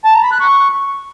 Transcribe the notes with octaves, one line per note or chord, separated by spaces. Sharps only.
A5
A#5
B5
F#6
C#6